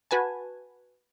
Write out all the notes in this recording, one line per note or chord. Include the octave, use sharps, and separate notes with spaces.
F#4 B4 G#5 A5